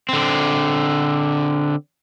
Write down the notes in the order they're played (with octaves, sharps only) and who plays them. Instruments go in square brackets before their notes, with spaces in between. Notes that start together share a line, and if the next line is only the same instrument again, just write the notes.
[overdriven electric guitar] D3 C4